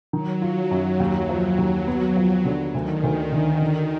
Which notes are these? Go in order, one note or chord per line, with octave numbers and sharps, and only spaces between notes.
D#3 F#3
F4
F#2
D#2
F3
D#2
B3
F3
D3
D2 D#3
D2
D3
D3